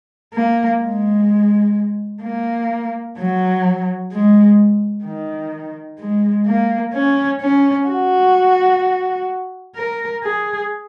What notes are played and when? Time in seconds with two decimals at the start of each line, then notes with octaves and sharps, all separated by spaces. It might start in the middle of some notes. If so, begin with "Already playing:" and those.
0.34 A#3
0.81 G#3
2.22 A#3
3.17 F#3
4.11 G#3
5.05 D#3
5.99 G#3
6.46 A#3
6.94 C#4
7.41 C#4
7.88 F#4
9.76 A#4
10.24 G#4